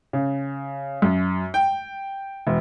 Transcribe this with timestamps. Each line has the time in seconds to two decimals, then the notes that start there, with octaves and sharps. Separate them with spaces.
0.13 C#3
1.02 F#2
1.54 G5
2.47 E1